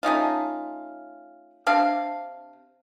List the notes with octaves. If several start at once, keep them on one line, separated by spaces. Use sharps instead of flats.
A3 C#4 D#4 F4
C3 D4 F5